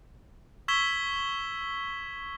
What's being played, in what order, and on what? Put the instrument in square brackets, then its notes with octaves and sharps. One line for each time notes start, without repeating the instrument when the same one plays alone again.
[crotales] C#6 E6 G#6 B6 E7 G7